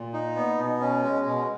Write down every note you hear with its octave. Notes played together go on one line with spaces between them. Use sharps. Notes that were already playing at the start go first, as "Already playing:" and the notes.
Already playing: A#2
D#4
B3
B2
C#4
G#3
B2